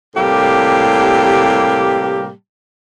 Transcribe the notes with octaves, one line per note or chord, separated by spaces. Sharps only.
A2 C3 G3 A#3 G4